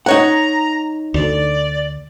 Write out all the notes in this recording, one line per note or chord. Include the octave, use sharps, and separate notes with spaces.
D#4 C#5 F#5 A#5
D2 D5